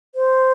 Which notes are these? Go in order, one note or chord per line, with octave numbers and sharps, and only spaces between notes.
C5